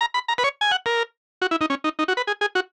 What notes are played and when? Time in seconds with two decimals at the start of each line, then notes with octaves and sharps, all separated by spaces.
0.01 A#5
0.14 B5
0.28 A#5
0.38 B4
0.44 C#5
0.61 G#5
0.71 F#5
0.86 A#4
1.42 F#4
1.51 E4
1.61 D#4
1.70 C#4
1.84 D#4
1.99 D#4
2.08 F#4
2.17 B4
2.27 G#4
2.41 G#4
2.55 F#4